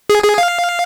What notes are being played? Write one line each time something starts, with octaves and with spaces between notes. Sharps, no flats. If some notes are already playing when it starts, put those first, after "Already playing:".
G#4
G#4
F5